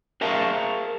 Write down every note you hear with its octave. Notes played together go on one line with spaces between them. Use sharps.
G#4 A#4 E5 F5 A5